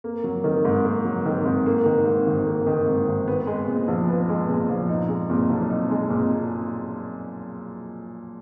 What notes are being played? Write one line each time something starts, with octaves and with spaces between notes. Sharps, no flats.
A#3
F#3
D#3
G#2
A#3
F#3
D#3
G#2
A#3
D#3
G#2
G#1
A#3
D#3
G#2
G#1
B3
G#3
A#2
A#1
B3
G#3
A#2
A#1
D#4
G#3
A#2
B1
D#4
G#3
A#2